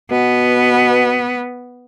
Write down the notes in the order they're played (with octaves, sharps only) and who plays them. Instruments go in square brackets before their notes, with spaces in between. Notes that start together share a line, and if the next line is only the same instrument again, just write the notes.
[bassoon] B2 [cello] B3